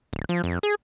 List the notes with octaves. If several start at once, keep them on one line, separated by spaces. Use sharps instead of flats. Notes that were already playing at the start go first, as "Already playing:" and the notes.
D1
F3
F2
G#4